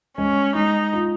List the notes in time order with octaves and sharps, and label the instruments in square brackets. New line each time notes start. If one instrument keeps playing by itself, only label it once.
[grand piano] G#3 [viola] C#4
[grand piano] G#3 [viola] D#4
[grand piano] F4